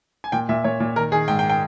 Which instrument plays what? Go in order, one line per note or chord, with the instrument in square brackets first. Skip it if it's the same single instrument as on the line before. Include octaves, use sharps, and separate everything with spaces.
[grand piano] G#5
A#2 G5
A#2 E5
A#2 C#5
A#2
D#3 A#4
D#3 G#4
G#2 G5
G5
G5